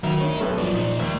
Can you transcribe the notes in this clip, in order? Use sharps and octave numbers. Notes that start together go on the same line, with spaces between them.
D2 D#3 F#3 D#4 A#4
D4 C#5
B1 F#2 G4 A4 B4 C#5
G2 F3 F#3 D5
A#2 D#4 C5
D#2 G#3 E5